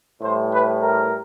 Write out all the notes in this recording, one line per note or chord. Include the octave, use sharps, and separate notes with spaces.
A2 E3 G3 C5
B4
A#4